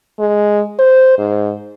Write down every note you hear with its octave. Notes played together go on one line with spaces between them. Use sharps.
G#3
C5
G#2